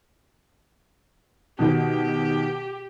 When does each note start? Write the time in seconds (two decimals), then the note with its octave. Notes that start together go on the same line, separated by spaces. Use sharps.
1.59 B2 D#3 G4